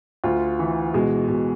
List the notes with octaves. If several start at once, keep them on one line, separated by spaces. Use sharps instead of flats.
D2 F4
E3
B2 G#3
B2